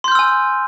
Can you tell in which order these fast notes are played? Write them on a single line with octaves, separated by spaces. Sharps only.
C6 G6 F6 E6 G#5